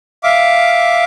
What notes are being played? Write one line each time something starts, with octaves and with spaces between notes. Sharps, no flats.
E5 F5 D6